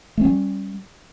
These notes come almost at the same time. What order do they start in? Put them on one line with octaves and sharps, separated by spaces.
A3 C#4 G3